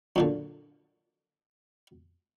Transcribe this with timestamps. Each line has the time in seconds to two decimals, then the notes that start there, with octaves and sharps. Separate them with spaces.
0.16 F#2 A#2 D3